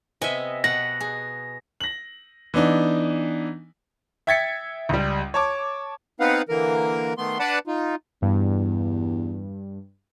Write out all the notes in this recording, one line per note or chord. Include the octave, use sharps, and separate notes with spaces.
C3 B3 D#5 E5 G#5
B2 B4 F#5 A#6
G#4
A#6 F#7
E3 B3 D4 D#4
E5 G5 G#6 A6 B6 C#7
C#2 G3
C#5 A5 D6
B3 C4 D#4 B4 F5 F#5
D3 E3 A#3 A#4
D#3 A3 B3 C6
D4 B4 D5 F#5 A5 B5
D#4 F4
E2 G2